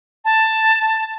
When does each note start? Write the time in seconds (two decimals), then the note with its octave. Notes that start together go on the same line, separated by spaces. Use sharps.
0.25 A5